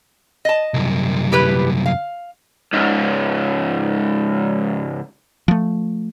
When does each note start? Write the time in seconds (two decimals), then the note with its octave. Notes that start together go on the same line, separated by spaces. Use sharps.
0.45 D#5 A5
0.74 C2 F#2
1.32 E4 G4 B4
1.86 F5
2.73 C#2 G#2
5.48 F3 A3